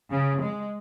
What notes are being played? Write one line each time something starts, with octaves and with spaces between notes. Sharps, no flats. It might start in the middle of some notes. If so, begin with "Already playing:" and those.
C#3
G#3